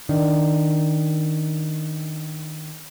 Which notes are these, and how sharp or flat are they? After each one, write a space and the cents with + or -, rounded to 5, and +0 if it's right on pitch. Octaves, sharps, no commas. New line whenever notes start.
D#3 +0 D4 +0